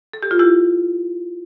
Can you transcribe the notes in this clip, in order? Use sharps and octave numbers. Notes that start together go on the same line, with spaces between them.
A4
G4
F4
E4 G4